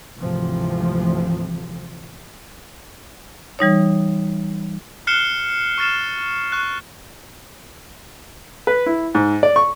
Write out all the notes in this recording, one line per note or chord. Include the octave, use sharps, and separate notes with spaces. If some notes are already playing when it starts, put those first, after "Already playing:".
G#1 D2 C3 E3 F3
E3 G3 D#4 C#5
F6 F#6 C7 C#7 E7 G7
C#6 F6 A6 C7 E7
C#6 F#6
B4
E4
G#2
D5
C#6